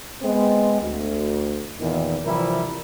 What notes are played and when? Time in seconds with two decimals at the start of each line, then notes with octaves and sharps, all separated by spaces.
0.22 G#3 B3 C4
0.81 D2
1.80 E2 A#2 D#3
2.25 C3 E3 F3 G3 E4 A#4